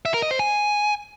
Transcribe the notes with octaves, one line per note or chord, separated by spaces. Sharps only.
E5
A#4
D#5
C5
G#5